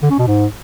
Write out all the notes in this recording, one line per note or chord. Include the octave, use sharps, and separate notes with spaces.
D3
C#4
B2
G#2